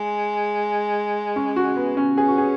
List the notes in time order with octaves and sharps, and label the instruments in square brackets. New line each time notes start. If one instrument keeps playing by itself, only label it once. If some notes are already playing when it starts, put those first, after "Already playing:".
Already playing: [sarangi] G#3
[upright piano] C#4
F#4
B3
C#4
[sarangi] C#4 [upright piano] G#4
[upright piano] F#4
G#4